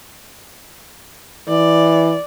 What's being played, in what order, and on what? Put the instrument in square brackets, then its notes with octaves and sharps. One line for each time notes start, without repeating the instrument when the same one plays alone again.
[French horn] E3 [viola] D5